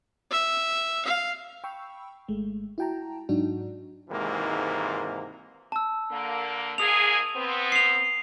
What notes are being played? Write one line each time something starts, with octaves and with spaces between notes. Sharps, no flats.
E5
F5
G5 B5 C#6 E6
G#1 G#3 A3
E4 F#4 G5 A5 A#5
G#2 F#3 D4 D#4 F#4
G#1 G#2 C3 E3 A#3
A5 E6
D3 A#3
G#2 A#3 G#4 D#6 F7
B3 C4
C7 F7